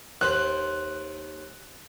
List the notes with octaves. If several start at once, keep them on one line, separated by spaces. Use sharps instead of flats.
D#2 C5 F#6